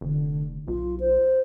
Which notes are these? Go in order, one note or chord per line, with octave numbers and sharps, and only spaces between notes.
F1 D3
B1 F4
C5